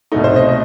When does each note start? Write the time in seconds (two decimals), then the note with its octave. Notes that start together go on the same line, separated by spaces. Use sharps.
0.12 C2 B2 A3 D#4
0.24 C5
0.36 D#5
0.49 D#5